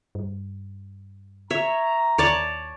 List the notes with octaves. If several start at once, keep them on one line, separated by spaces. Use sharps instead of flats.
G2
C#5 E5 A#5
D#2 C#5 D5 A5